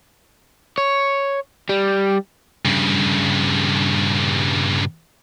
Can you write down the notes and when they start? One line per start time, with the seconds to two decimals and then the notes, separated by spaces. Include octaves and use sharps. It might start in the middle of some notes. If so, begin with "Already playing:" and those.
0.78 C#5
1.69 G3
2.65 G2 C#3